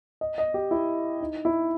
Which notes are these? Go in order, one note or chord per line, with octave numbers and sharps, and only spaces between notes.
D#5
D#5
G4
E4
D#4
E4